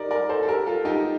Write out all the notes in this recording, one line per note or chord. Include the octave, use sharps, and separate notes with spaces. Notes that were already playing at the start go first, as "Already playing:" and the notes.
Already playing: D#4 G4 A#4 D5
A#4 D5
A4 C5
A4
G4 A#4
F4 A4
D#4 G4